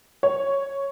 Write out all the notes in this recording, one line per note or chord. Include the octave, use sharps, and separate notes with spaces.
C#5